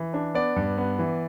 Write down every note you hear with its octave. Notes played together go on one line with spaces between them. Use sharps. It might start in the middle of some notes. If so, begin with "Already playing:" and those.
Already playing: E3
D4
B3 D5
G2
B3
E3